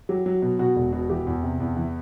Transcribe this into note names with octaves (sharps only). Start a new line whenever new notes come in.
F#3 G4
F#3
B2
B2 F#4
E1
B2
E3 G4
E2
C3
E2
E3